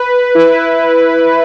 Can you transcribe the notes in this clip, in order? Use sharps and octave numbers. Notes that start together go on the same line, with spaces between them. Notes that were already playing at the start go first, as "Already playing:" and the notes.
Already playing: B4
E4